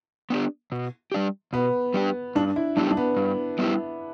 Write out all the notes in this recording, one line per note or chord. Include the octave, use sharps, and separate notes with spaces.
B3 D4 G4
B2
G3 D4 G4
B2 B3
G3 D4 G4
G2 D4
E4
G3 B3 D4 E4 G4
D4
B3
G2
G3 B3 E4 G4